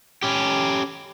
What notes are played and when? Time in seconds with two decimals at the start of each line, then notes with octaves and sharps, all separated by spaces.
0.23 C#4 G4